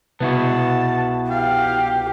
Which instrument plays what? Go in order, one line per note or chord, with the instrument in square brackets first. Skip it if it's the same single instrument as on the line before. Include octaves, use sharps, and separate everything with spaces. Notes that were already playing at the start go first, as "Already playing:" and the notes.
[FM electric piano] C2 B2 [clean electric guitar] B3 E4 F#4 [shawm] A5
[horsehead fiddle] G4 [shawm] F5